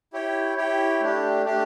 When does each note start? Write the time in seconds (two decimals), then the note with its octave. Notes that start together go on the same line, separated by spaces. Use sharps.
0.13 E4 G4 C#5 G5
0.57 E4 G4 C#5 G5
1.00 A3 D4 G4
1.45 A3 D4 G4